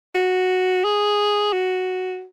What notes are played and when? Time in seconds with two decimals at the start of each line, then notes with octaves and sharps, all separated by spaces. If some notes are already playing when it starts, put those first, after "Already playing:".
0.15 F#4
0.84 G#4
1.53 F#4